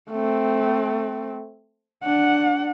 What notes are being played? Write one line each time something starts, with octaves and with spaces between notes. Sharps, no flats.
A3 C4
D4 F#5